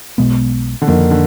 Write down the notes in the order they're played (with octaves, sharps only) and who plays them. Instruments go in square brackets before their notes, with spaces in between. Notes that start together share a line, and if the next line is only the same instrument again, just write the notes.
[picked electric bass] B1 B2 G#3 B3
[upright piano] D3
[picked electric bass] F2 F3 A#3 [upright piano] D#3
[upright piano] D3